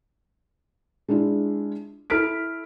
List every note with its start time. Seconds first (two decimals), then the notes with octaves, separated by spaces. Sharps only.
1.08 G#3 D4 E4 F4
2.10 E4 A4 F6 B6 D7